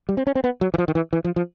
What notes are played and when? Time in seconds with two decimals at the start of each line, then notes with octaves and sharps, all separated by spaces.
0.09 G3
0.17 C4
0.27 C#4
0.35 C4
0.44 B3
0.61 F#3
0.74 E3
0.78 F3
0.88 D#3
0.95 E3
1.13 E3
1.24 F3
1.36 F3